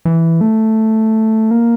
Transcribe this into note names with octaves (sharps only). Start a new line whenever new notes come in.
E3
A3
A#3